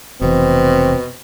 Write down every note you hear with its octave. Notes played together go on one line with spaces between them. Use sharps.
F1 B2 E3 C4